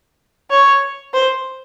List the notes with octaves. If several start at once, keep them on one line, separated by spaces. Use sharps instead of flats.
C#5
C5